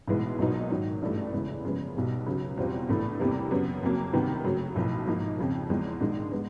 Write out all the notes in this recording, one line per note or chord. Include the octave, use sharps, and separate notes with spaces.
B1 A2 E3 G#3 B3
B1 A#2 F#3 B3 D#4
G#2 D#3 F#3
A1 G2 E3 A3
E2 C#3 E3 G#3
F#2 C#3 F3 G#3 B3
B1 B2 G3
C#2 C#3 F#3
E2 B2 G3 C4 F4
A#1 A2 E3 A3
E2 C3 E3 G3 A#3
F#2 C#3 F#3 B3
F2 C#3 F#3 A#3
C#2 C3 D#3 G3 B3
F#2 C#3 F#3 A3
B1 A2 F3
G#2 F3 A#3 D#4
F2 C#3 F3
E2 C#3 F3 G#3
A#1 G#2 D#3 G#3
G#3 B3